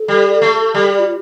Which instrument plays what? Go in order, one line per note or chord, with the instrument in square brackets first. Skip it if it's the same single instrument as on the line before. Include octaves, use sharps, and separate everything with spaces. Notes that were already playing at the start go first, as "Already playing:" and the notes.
Already playing: [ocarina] A4
[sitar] G3
A3
[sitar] G3 [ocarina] A4
[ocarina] G4
F4